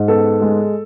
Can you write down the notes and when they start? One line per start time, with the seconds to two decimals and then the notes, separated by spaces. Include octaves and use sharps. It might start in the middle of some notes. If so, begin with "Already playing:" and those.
Already playing: G#2
0.08 B3 A4
0.42 G#3